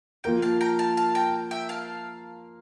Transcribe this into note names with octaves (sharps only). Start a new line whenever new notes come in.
F3 A#3 F4 A#4 G5 A#5
F5 A5
G5 A#5
F5 A5
F5 A5
G5 A#5
E5 G5
F5 A5